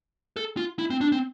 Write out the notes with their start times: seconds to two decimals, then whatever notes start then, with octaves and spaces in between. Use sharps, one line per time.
0.37 A4
0.57 F4
0.79 E4
0.90 C4
1.01 D4
1.12 C4